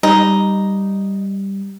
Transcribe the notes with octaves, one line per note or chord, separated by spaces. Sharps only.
G3 D#4